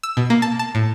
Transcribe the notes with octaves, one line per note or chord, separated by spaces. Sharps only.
E6
B2
A#3
A5
A5
A2